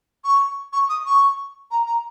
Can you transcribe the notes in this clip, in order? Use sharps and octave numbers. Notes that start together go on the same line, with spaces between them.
C#6
C#6
D#6
C#6
A#5
A#5